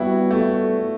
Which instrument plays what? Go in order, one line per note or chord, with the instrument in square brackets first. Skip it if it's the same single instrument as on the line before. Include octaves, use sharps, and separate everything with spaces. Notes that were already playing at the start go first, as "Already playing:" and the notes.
Already playing: [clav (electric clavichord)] G3 B3 [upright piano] E4 F#4
[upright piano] A3